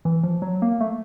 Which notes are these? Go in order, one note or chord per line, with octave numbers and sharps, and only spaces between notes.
E3
F3
F#3
A#3
A3